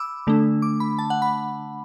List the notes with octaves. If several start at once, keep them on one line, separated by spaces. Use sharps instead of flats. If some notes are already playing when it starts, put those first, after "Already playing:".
Already playing: B5 D6 E6
D3 A3 D4
D6
B5
A5
F#5
B5